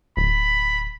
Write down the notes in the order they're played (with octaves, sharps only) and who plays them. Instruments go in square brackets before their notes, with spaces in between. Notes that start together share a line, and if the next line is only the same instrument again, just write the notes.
[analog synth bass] D1 [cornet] B5